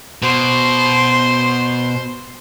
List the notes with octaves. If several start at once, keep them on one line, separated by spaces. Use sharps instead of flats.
B2 C5